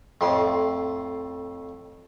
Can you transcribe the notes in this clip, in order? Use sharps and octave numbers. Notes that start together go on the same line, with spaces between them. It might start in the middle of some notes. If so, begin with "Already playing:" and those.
F2 A2 C6